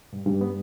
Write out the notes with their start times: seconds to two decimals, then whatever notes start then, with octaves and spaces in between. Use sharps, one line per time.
0.13 G2
0.26 G2
0.41 B3